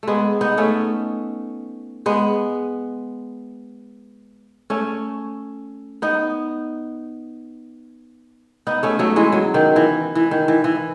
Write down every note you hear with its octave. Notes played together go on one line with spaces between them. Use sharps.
G#3 A3 B3
B3 D#4
A3 C#4
G#3 B3
A3 C#4
B3 D#4
B3 D#4
A3 C#4
F#3 A3
E3 G#3
F#3
D#3
E3
E3
D#3
E3
E3